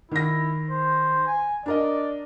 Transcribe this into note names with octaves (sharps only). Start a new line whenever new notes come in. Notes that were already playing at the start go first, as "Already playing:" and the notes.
D#3 E4 A#6
C5
G#5
D4 A#4 D5 D#5